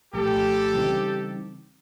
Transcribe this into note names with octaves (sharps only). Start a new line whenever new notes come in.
C2 A#2 F3 A3 G4 A4
C#3 E3 G3 C4 D#4